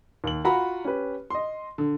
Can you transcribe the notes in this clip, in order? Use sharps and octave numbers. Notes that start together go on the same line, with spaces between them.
D#2 F#7
F4 F#4 F#5 A#5 B5
C#4 G4 B4
D#5 C6
D3